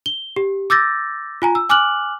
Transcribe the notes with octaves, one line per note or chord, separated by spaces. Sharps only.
G7
G4
D6 E6 G6 A6 A#6
F4 G#5 A#5
E6
G#5 D6 F6 F#6 F#7